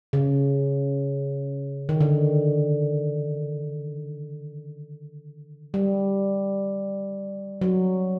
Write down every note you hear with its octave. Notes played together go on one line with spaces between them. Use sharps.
C#3
D#3
D3
G3
F#3